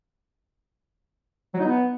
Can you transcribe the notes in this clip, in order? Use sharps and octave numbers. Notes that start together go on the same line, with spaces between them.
F#3
D#4
B3